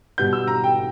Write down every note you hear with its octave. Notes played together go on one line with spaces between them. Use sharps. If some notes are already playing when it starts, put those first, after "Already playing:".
B2 G3 B3 G6
E6
A#5
G5